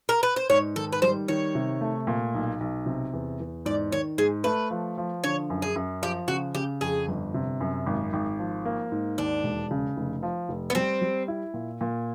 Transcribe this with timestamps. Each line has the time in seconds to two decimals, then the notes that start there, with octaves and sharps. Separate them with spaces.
0.09 A#4
0.23 B4
0.36 C5
0.49 G#2 C#5
0.76 D#3 A4
0.93 B4
1.02 G3 C5
1.28 D#3 C#5
1.55 C3
1.81 A3
2.07 A#2
2.34 B1
2.60 B1
2.86 C3
3.13 E2
3.40 E2
3.65 G#2 D5
3.92 D#3 C#5
4.18 G#2 G#4
4.44 A3 B4
4.70 F3
4.98 F3
5.24 D3 C#5
5.50 F#2
5.62 G#4
5.76 F#2
6.02 F3 G4
6.28 C#3 F#4
6.54 C#3 G4
6.81 F2 G#4
7.08 G1
7.34 C3
7.61 F#2
7.86 G#1
8.13 G#1
8.39 F3
8.65 A#3
8.92 G#2
9.18 D#2 D4
9.44 E1
9.71 C#3
9.97 F1
10.23 F3
10.49 F1
10.70 B3
10.75 G3 C4
11.01 G3
11.28 E4
11.54 A#2
11.81 A#2